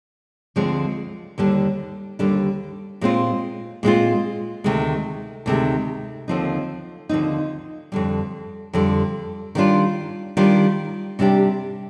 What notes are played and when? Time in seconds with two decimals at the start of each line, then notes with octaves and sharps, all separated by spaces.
0.56 D2 D3 F3 G#3 C4
1.38 D#2 D3 G3 D4
2.19 D#2 D3 G3 D4
3.01 A#2 G#3 C4 F4
3.83 A#2 G#3 C4 F4
4.64 D2 C3 D#3 G#3
5.46 D2 C3 D#3 G#3
6.28 D#2 D3 F3 C4 D#4
7.09 D#2 D3 F3 C4 D#4
7.92 F2 D3 G3
8.73 F2 D3 G3
9.55 D#3 G3 D4 F4
10.37 D#3 G3 D4 F4
11.19 C3 G3 D4 G4